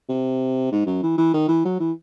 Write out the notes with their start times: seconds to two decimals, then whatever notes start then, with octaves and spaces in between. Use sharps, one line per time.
0.09 C3
0.72 G#2
0.86 F#2
1.03 E3
1.18 E3
1.34 D#3
1.48 E3
1.65 F#3
1.80 E3